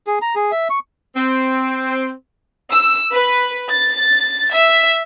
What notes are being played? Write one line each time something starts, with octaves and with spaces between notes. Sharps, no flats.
G#4
A#5
G#4
E5
C#6
C4
E6
B4
A6
E5